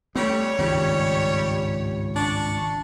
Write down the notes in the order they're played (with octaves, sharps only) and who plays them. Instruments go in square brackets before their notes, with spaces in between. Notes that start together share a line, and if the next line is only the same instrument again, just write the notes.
[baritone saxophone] G3 [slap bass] A3 B3 [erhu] C#5
[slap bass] G#1 C#2 G2 [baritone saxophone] G3
[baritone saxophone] D4 [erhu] C#6